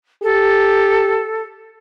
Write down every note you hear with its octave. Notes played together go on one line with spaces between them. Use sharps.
G4 A4